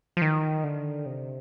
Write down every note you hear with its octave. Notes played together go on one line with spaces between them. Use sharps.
F3
D#3
D3
C3